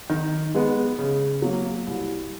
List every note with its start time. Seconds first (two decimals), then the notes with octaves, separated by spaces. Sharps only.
0.10 D#3
0.55 G#3 B3
0.99 C#3
1.42 F#3 A#3
1.87 C2